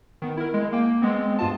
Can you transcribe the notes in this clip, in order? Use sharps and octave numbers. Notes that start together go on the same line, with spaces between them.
D#3 B3
E4 A#4
G#3
A#3 G5
G#3 B3 C4
G2 F4 A5